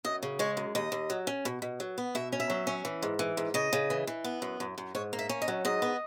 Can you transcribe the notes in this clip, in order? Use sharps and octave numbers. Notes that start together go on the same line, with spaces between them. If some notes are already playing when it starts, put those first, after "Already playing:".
F#2 D#5
C#3
G#3 C#5
F#2
D#2 D#5
D#2
F#3
C#4
B2
B2
F#3
B3
B2 E5
C#4
E5
F#3
C#4
E3
G#2
E3
G#2
C#3 D#5
C#3
E3
E3
B3
F#2
F#2
F#2
G#2 C#5
A#3
E5
C#4
D#5
F#3
G#2 D#5
B3